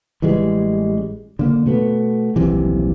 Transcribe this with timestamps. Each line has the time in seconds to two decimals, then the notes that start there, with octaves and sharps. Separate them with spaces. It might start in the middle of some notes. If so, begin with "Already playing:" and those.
0.22 A1 E3 G3 G#3
1.39 D3 A#3
1.66 B2 A3 B3
2.36 D#1 B1 C3 E3